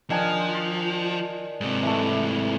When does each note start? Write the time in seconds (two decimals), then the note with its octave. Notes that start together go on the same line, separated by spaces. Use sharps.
0.10 D#3 F3 D4 G#5
1.61 G#2 C3
1.83 E3 A3